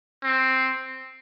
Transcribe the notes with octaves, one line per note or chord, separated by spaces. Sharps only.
C4